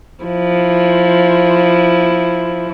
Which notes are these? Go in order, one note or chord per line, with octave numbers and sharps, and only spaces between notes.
F3 E4